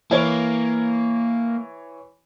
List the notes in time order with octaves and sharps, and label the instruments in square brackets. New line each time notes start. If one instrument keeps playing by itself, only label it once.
[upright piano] E3 C#5 [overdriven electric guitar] A#3